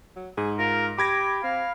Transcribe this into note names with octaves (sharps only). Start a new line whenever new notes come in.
F#3
G#2 G#4
F4 A#4
G4 B5 D6 G#6 A#6
C4 F5